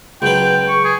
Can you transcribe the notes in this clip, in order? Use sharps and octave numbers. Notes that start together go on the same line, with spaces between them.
C#2 F#3 B4 G5
C#6
G#4